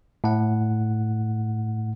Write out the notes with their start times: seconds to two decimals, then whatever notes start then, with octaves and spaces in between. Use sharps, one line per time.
0.24 A2 F#5